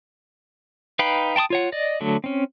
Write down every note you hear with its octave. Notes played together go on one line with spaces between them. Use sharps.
D#4 B4 F5 G5 B5
G5 A5 C6 D#6
F4 C#5 F#5
D5 D#5
D3 F#3 A3
C4 C#4